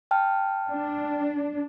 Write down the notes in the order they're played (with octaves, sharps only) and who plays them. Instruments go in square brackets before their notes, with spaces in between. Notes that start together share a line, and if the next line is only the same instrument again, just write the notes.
[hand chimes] G5 A5 F6
[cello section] D4